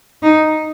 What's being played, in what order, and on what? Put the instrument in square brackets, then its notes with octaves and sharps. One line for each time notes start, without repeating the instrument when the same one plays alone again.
[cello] D#4